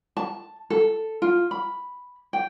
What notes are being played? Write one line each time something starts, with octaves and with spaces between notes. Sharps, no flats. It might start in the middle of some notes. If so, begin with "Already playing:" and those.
A5
A4
F4
B5
G5